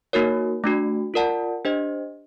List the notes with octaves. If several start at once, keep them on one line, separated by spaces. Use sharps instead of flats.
A#3 D#4 F#4 A#4 C#5
A3 D4 F#4
F4 A#4 D5 F#5 A5
D4 G4 C5 D#5